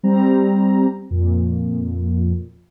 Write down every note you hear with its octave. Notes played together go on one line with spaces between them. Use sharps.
G3 C4 A#5
F2 A#2